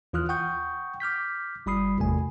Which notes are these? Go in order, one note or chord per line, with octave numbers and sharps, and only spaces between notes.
D#2 E3 F4 D#6 F6 F#6
F#5 G5 C#6 D#6 G6
D6 F6 G6 B6
G1 G3 B5 D#6 C7
G#1 E2 C3 A3 G#5